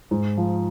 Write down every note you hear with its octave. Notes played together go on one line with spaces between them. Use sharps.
G#2
F3